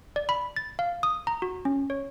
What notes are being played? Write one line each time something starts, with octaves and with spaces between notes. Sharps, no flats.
D5
B5
A6
F5
D#6
A#5
F#4
C#4
C#5